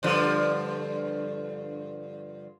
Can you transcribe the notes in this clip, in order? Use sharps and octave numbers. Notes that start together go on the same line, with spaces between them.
G2 D3 F3